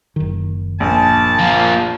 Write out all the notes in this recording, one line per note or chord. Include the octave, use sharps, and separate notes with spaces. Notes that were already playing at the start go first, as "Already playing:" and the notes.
F#1 D#3
A#1 A5
F3 A#3